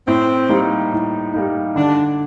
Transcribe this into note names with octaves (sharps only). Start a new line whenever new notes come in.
A2 C4
G3 A#3 D#4
A2
G3 A#3 D#4
D3 D4